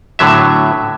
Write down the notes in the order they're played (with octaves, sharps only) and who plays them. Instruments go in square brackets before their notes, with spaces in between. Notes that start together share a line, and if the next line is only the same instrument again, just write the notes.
[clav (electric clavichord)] A2 D3 F#3 E5